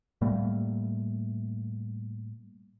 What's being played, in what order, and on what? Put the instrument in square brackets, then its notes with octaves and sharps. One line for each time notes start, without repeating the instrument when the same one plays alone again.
[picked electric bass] A2 G3 A3 A#3